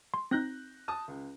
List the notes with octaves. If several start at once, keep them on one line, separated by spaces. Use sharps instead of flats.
C6
C4 D#4 F#6 G6 A#6
A5 D#6
C#2